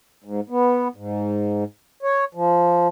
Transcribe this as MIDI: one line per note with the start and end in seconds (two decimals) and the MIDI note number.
0.24 0.40 44
0.49 0.88 59
0.96 1.64 44
2.03 2.25 73
2.34 2.88 53